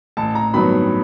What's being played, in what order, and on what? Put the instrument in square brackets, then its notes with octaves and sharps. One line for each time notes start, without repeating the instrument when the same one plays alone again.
[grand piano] A1 A5
A#5
G2 D#3 F#3 B3 B5